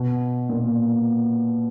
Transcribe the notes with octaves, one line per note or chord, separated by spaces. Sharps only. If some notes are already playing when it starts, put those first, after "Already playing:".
Already playing: B2
A#2